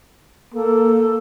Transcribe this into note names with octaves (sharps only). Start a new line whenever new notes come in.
A#3 A4